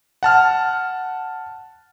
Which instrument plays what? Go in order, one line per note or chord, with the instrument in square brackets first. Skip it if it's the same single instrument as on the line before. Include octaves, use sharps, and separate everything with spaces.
[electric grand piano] F#5 A5 F6